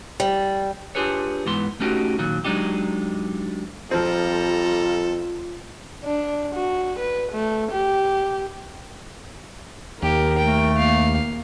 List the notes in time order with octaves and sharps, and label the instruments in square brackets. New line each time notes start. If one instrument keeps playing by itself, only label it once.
[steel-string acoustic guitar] G3
[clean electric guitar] D4 F4 G4 G#4 B4 C#5
G#2 E3 B3 C6
A3 C#4 D#4 F#4 G4
A#2 D#3 F#3
F#3 G#3 D4 D#4 G4
[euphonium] F2 [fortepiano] F3 C4 [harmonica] G3 A4 A#5 [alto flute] F4
[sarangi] D4
F#4
B4
A3
G4
[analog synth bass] D#2 [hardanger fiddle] G4 [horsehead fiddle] A#4
[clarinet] A3 [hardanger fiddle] G5
[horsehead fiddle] A#3 [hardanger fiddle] F5